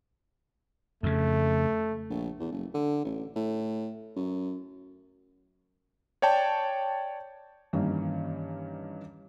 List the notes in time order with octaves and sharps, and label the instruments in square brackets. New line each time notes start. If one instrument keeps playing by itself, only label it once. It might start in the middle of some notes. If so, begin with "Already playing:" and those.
[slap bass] F2 C#3 [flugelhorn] A3
[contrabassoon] A#1
E2
F#1
D3
A1
A2
F#2
[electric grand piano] C#5 D5 G5 A5
[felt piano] G2 D#3 E3 G3 A#3 C#4